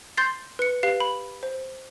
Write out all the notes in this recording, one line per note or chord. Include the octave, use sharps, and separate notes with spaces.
C6 G6 A6 C7
B4 C#7
G4 B4 F5 C7
B5
C5